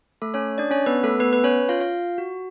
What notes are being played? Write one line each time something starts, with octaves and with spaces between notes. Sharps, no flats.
A3 A4
C#4 C#5
D4 D5
C#4 C#5
B3 B4
A3 A4
B3 B4
B4
C#4 C#5
F4 F5
F4 F5
F#4